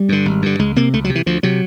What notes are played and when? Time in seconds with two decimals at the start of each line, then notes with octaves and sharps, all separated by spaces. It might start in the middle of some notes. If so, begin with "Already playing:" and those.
Already playing: G3
0.09 G2 D3
0.25 G#1
0.42 G2 D3
0.59 C#2 G#3
0.76 C3 A#3
0.94 C#2 A3
1.04 F#3
1.10 C3
1.15 E3
1.26 D2 F3
1.43 C3 F#3